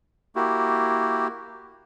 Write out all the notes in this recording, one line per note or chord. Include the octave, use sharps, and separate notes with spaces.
A#3 E4 F#4 G4